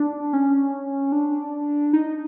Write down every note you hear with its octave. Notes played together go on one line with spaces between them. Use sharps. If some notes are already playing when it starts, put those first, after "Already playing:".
Already playing: D4
C#4
D4
D#4